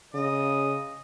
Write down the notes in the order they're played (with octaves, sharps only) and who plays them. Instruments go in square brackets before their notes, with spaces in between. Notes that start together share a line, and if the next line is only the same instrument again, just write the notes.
[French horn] C#3 [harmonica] D#5